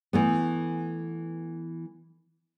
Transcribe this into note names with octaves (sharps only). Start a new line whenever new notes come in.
E3 A3 B3